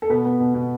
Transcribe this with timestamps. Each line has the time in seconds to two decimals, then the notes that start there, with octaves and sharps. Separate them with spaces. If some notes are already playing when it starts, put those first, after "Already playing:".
0.02 A4
0.09 B2 B3 B4
0.25 B3
0.40 B2
0.54 B2